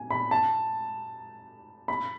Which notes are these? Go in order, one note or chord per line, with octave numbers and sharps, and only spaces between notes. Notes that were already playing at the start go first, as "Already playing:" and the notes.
Already playing: G#5
B5
A5
B5